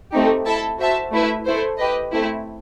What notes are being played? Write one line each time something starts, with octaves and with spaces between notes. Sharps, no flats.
A3 C4 D#4 G4
E4 A4 E5 A5
F#4 C5 E5 A5
A3 E4 B4 E5
A3 E4 A4 C5
G4 B4 D#5
A3 C4 E4